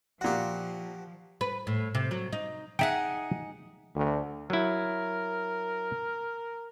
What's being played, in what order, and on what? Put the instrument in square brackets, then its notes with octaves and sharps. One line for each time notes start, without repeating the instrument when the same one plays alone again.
[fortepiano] A#2 F#5 [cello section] F3 [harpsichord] F#4 G4
[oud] B4
A2
C3
F#3
D#4
[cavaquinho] D#4 G#4 F#5 [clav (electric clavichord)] E5 G5
[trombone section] D2
[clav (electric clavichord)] F#3 E4 [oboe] A#4